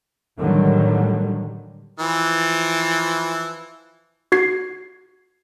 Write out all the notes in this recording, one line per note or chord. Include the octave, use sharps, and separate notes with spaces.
A2 D3 D#3 F#3 G3
E3 F3
F#4 G#6 C7